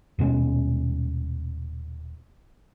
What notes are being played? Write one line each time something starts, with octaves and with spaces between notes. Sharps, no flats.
D#1 B2 G#3 C#4